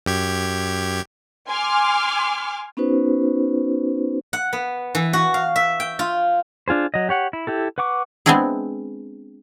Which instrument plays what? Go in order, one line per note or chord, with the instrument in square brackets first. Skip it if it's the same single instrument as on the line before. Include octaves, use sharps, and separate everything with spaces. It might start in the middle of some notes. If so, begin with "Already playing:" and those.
[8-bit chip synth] F#2 G4 G#6
[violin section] G#5 C6 D6 F6
[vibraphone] B3 C#4 D#4 F#4 B4 C5
[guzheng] F#5
B3
E3
F#4
F5
E5
G5
F4
[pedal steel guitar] D4 F4 G#4 C5
F#3 D#5
G4 C#5 F#5
E4
E4 G4 A4
B4 F#5 C#6 D6
[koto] G#3 B3 C4 D4 E4 G#4